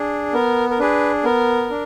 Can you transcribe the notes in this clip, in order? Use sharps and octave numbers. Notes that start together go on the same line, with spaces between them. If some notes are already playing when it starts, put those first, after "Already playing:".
Already playing: D4 G#4
B3 A#4
A#4
D4 G#4 B4
B3 A#4
D4